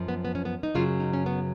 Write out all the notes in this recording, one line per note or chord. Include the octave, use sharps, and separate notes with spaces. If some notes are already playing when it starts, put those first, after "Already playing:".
Already playing: F#2 F3
B3
B3
C#4
B3
D#4
F#2 C#3 F#3 F4
D#4
C#4
B3